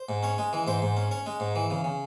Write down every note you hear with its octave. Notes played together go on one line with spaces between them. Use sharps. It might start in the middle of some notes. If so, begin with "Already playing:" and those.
Already playing: C5
G#2
C#4 C#5
G#3
E3
G#2 C5
G#2
C#4
C#4 C#5
G#3
G#2
E3
C#3
C#3